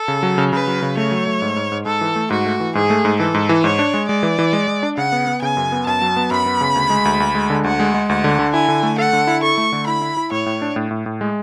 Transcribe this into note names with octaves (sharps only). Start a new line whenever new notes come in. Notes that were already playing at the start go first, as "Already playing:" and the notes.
Already playing: A4
C#3
F#3
C#3
C#3 B4
F#3
C#3
A3 C#5
F#3
A3
G#2
G#2
G#2
G#2 A4
E3
A3
G#2 F#4
A3
E3
G#2 G#4
A3
G#2
E3 A4
G#2
E3
G#2 C#5
D4
G#3
G#3 D5
E3
E3
G#3
G#3
D4
C#3 F#5
B3
B3
C#3 G#5
F#2
B3
F#2 A5
F#3
B3
F#2 B5
B3
C#3
D2
G#3
D2
D2
G#3
D3
D2 F#5
G#3
G#3
D2 F#5
D3
D3
E4 G#5
D3
A3
A4 F#5
D3
E4
A4 C#6
A3
D3
E4 B5
E4
E4
A2 C#5
A2
D4
A2
A2
A2
G#3